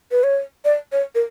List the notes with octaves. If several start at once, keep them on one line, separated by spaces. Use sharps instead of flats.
B4
C#5
D5
C#5
A#4